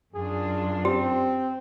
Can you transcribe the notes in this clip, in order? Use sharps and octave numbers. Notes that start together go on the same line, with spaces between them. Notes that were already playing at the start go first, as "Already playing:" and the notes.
F#2 D4 F4 G#4
C4 G4